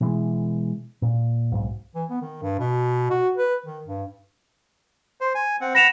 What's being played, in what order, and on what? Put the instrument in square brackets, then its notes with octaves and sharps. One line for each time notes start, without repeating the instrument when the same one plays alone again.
[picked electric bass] B2 E3 G#3
A#2
B1 G#2
[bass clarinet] E3
B3
D#3
G2
B2
F#4
B4
D#3
G2
[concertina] C5
G#5
C4 F#5
[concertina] F#5 B5 [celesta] A#6 E7 F7